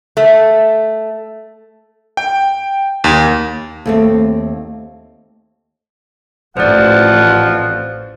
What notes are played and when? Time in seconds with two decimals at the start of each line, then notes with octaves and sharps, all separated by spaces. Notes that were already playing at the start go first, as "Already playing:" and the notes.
0.17 A3
2.17 G5
3.04 D#2
3.86 D#2 A3 C4
6.57 A1 F2 F3 C5 D5 F#5